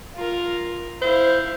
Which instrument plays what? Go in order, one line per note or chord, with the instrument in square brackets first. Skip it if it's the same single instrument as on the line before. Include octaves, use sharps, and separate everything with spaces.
[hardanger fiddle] F4 A#4
[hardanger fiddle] E4 F5 [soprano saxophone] C5